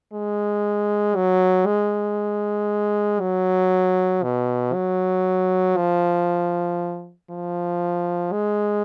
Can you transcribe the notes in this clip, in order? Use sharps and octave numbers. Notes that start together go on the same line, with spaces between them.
G#3
F#3
G#3
F#3
B2
F#3
F3
F3
G#3